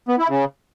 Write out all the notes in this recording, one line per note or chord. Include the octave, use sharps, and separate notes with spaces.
B3
E4
C#3